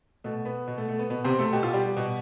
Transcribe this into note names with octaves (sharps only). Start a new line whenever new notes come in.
B2 A3
B3
B2
A3
A3
B3
B2 B3
C3 C4
A3 A4
B2 G4
F4
G3 G4
B2